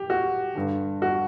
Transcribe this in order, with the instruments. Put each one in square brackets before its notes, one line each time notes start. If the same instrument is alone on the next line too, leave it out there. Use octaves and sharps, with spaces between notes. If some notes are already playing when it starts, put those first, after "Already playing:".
Already playing: [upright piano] G4
F#4
G2 D3
F#4